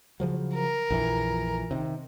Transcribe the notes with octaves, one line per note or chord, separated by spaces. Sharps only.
C#3 F3 F#3
A#4
A#1 F2 E3
C3 D#3